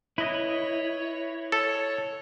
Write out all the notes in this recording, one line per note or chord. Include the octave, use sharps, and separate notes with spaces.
E4 B4 C#5 D#5
A4 C#5